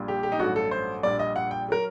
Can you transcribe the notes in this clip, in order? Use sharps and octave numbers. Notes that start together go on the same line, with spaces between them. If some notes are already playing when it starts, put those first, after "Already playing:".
Already playing: A#1 A#2 G3
G4
G4
D#4
A1 G2 F#3 A3 F#4
A4
C5
A#1 A#2 G3 D5
D#5
F#5
G5
F#3 A#4